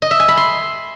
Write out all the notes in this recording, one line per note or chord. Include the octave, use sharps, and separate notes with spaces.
D#5
E5
G#5
B5
C6